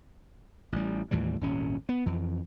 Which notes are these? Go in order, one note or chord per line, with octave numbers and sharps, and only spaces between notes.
A1 G3
D#2 A2 E3 G3
D#1 G#1 C#4
B3
F2 E3